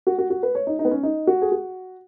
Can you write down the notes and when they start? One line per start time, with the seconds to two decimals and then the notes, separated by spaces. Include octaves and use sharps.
0.07 F#4
0.19 F#4
0.30 F#4
0.43 B4
0.55 C#5
0.67 D#4
0.79 D#4
0.85 B3
0.91 C#4
1.03 D#4
1.27 F#4
1.42 G#4
1.52 F#4